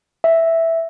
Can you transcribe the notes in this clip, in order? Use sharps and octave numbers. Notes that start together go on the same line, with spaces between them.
E5